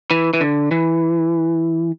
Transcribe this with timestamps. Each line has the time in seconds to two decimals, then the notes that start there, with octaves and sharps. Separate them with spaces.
0.11 E3
0.34 E3
0.41 D3
0.71 E3